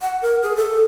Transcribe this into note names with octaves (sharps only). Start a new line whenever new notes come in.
F#5
A#4
G#4
A4